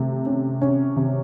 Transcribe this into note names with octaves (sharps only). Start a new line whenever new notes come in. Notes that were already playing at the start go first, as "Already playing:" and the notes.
Already playing: C3 A3
C#4
C#4
C3